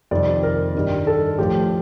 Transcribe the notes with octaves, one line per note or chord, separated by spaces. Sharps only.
F2 C3 D#3 G3 D5
A#4
G2 D#3 G3
A4
A2 F3 G4